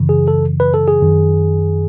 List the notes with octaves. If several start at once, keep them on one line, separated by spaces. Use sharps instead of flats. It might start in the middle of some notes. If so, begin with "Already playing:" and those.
Already playing: F#2 C#3 E3
G#4
A4
B4
A4
G#4
F#2 D#3